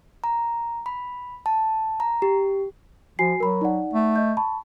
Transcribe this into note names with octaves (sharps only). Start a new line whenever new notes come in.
A#5
B5
A5
A#5
G4
F3 F#4 G#5 C7
F#3 A#4 B5
D#4 D5 F#5
A3
D#5 G6
A5 B5 C#6